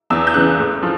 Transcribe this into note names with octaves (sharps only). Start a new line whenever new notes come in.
E2 E6
G6
C#3 E3 F#6
A2
F3